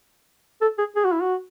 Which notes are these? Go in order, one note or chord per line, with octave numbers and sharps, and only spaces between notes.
A4
G#4
G#4
F#4
E4
F#4